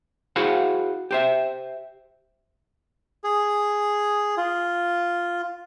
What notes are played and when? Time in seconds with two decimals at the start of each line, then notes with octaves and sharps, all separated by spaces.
0.36 E4 F#4 G#4 C5 F5 F#5
1.11 G4 C5 E5
3.24 G#4
4.37 F4